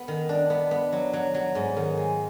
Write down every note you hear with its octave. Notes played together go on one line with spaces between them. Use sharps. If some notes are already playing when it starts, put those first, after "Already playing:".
Already playing: B3
D#3
D4
B3
B3
F#3
F#3
F#3
G#2
D#3
G#3